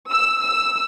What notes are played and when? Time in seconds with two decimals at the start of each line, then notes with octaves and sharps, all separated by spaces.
0.11 E6
0.42 E6